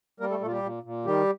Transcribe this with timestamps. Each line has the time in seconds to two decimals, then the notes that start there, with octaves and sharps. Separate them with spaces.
0.20 G3 A#3 A#4
0.30 A3 A4
0.41 A#2 A3 A4
0.47 F4
0.51 G3 G4
0.63 A#2
0.83 A#2
1.05 D#3 G3 G4